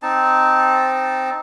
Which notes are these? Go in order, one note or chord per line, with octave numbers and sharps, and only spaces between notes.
C4 D#4 A5